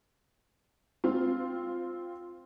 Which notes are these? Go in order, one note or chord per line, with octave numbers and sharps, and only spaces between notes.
C4 F4